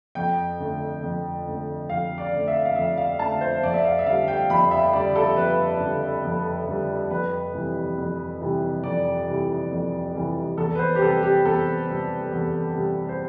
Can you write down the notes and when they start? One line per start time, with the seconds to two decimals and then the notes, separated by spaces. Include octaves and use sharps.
0.15 F2 G5
0.59 D3 A3
1.03 F2
1.46 D3 A3
1.89 F2 F5
2.18 D5
2.33 D3 A3
2.48 E5
2.65 F5
2.76 F2 E5
2.97 F5
3.19 D3 A3 A5
3.41 C5
3.63 F2 D5
3.74 E5
3.84 F5
3.99 E5
4.06 D3 G3 F5
4.28 G5
4.50 F2 B5
4.71 E5
4.93 D3 G3 D5
5.16 A4
5.37 F2 B4
5.80 D3 G3
6.24 F2
6.67 D3 G3
7.10 F2 B4
7.54 C3 E3 G3
7.97 F2
8.41 C3 E3 G3
8.84 F2 D5
9.28 C3 E3 G3
9.71 F2
10.14 C3 E3 G3
10.57 E2 A4
10.75 B4
10.79 C5
10.95 G4
11.01 C3 G3 A4
11.23 G4
11.44 E2 A4
11.88 C3 G3
12.31 E2
12.75 C3 G3
13.09 C5